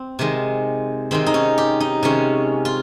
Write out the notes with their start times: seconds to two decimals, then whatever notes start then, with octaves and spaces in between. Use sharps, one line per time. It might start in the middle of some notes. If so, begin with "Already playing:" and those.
Already playing: C4
0.19 C3 D#3 G#3
1.11 C3 D#3 G#3 C4
1.26 D#4
1.34 C#4
1.58 G4
1.80 D#4
2.03 C3 D#3 G#3 C#4
2.65 F4